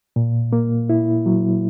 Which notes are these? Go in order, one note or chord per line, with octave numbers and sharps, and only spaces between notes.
A#2
A#3
E4
F#3